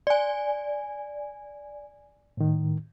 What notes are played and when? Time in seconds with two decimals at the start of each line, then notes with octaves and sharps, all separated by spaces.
0.07 D5 G#5
2.37 A2 D#3